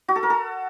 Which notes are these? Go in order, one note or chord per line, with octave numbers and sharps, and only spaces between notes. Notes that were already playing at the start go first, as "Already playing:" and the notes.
F#4
A4
A#4
A4